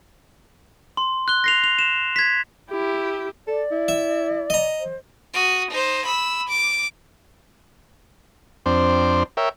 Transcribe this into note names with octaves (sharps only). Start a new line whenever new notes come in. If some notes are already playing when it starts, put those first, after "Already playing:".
C6
F#6 G7
A#6 C7 F7
F7
E7
G#6 B6
E4 G4
A4 D5
E4
E5
D#5 A#5
C5
F#4 D#6
D#4 C5
B5 E6
D6
F2 C4 D4 C5
A#4 C#5 E5 G5